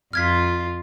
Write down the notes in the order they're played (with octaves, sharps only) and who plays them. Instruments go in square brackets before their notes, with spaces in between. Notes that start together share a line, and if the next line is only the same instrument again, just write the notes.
[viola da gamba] F2 F4 [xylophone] F6 G#6 B6